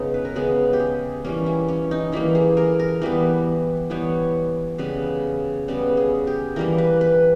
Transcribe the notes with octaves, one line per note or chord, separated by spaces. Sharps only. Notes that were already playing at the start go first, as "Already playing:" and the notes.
Already playing: C#3 G#3 B3 D#4
B4
A#4
C#3 G#3 B3 G#4
G4
G#4
E3 G3 A#3 C#4
E4
C#4
D#4
E3 G3 A#3 E4
G#4
A#4
A#4
E3 G3 B3 B4
E3 G3 B3 C#5
C#3 G3 B3 B4
C#3 G3 B3
G#4
G4
E3 G3 A#3 A#4
B4
B4